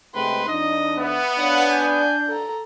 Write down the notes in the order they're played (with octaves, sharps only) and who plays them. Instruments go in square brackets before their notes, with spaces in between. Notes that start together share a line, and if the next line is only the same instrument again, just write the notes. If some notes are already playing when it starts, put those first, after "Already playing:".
[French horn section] C3 G#3 A3 [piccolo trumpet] B4 [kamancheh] G5 C6
[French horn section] F2 D4 [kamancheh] D#4 [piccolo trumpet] D#5
[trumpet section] B3 [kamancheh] E5
[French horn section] D4 D5 [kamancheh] C#5 F5 [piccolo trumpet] F#5
[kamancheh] G#5 [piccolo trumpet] G6
[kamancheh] A4 A#5